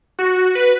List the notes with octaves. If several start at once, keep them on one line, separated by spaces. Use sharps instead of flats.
F#4
B4